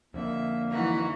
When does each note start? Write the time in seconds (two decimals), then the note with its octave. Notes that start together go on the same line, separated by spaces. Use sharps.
0.14 F2 D3 A#3 E5
0.71 E3 D#4 F#4